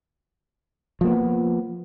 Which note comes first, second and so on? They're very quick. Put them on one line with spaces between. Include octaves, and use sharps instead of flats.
F3 A#3 B3